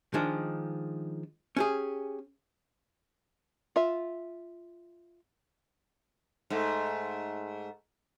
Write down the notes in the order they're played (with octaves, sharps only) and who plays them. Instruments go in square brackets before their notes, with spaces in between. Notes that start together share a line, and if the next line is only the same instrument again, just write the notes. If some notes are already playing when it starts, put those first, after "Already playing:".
[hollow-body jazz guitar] D#3 F3 G#3 D4
C#4 G4 G#4
[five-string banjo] F4 E5
[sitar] G#2 A3